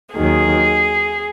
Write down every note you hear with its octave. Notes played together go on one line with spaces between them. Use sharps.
D#2 D#3 F#3 G#4